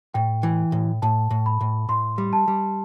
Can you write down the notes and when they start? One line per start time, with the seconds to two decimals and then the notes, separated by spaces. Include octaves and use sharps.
0.14 A2 G5
0.43 E3
0.72 A2
1.02 A2 A5
1.31 A2
1.46 B5
1.61 A2
1.89 A2 C6
2.18 G3
2.33 A5
2.48 G3